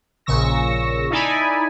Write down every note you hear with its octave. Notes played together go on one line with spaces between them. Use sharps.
A#1 A#2 C#3 C#6 E6 A#6
D#4 E4 A4 D5 G#5 B5